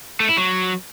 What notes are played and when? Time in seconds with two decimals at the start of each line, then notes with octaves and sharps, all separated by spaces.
0.20 A3
0.29 E4
0.38 F#3